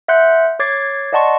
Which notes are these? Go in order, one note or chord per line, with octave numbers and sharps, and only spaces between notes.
E5 F#5 C6 F#6 G6 C#7
C#5 D6 G#6 A6 C7
D5 D#5 F#5 A5 C6 C#6